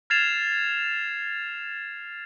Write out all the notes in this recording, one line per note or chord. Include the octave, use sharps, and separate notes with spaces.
F6 G#6 A6 C7 E7 F7